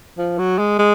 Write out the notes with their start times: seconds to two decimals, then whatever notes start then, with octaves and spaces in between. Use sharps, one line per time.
0.18 F3
0.38 F#3
0.58 G#3
0.79 G#3